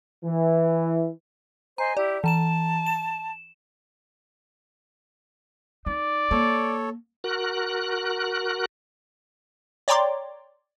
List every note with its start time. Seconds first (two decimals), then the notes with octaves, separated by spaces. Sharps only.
0.24 E3
1.78 C5 D#5 G#5 A#5
1.97 E4 G4 D5
2.24 E3 A5 A#5 E7
2.87 E7
5.86 D#4 D5
6.31 A#3 A4 C#5
7.24 F#4 A#4 F#6
9.88 C#5 D5 G5 A#5 C6 D6